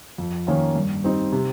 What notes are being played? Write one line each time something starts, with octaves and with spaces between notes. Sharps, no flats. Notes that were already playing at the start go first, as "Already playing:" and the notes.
F2
D#3 A#3 C#4 F4
G2
G3 C4 D#4
C3